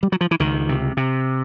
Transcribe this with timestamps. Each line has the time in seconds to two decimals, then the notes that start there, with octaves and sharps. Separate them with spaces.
0.03 G3
0.12 F#3
0.21 F3
0.31 E3
0.40 C#2 D#3
0.69 C3
0.97 C3